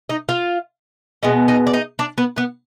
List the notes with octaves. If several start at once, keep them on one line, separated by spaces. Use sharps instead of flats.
D#4 D#5
F4 F5
B2 G#3 B3 D#5
D#4 D#5
D5
D#4 D#5
D4 D5
B3 B4
B3 B4